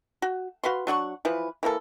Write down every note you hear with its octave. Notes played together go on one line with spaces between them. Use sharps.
F#4
F#4 B4 F5 C6
F#3 D4 F#5 C#6
E3 F3 B4
E3 A#3 G#4 A4